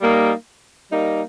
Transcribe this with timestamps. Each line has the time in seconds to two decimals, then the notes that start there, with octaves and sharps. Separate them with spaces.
0.01 G3 A#3 D#4
0.90 G3 A#3 D#4